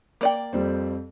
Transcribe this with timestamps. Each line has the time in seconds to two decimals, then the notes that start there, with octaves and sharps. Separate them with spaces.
0.21 A#3 D5 G5
0.53 F2 G3 C4